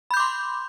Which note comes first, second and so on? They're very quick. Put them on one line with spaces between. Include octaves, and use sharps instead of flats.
B5 G6 D6 C6